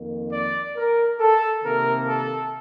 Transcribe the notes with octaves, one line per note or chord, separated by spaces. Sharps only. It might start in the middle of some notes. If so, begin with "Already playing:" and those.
Already playing: F2 D#3 A#3
D5
A#4
A4
C3 D#3 A#3 A#4
A4